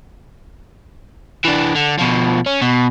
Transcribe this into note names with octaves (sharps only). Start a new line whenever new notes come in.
E3 D4
D3
B2 F3
C#4
B2